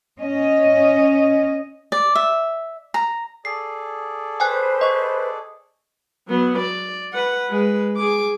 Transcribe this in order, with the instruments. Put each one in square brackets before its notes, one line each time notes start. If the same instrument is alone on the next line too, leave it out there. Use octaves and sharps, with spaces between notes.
[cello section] C#4 D#5
[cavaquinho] D5
E5
A#5
[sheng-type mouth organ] G#4 A4 D5 [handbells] C7
[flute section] B4 C5 [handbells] G5 G#5 F#6
[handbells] D#5 C#6
[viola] F#3 B3
D5
B4 F#5
G#3 B4
G#4 D6